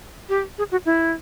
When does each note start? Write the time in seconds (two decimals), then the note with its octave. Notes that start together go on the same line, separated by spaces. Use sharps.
0.29 G4
0.58 G#4
0.71 F#4
0.86 E4